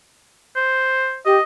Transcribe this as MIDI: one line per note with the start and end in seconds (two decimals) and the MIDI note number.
0.56 1.17 72
1.26 1.37 67
1.26 1.43 75